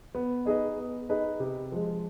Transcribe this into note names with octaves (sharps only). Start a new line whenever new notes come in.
B3
D#4 G#4 B4 D#5
B3
D#4 G#4 B4 D#5
C3
F3 G#3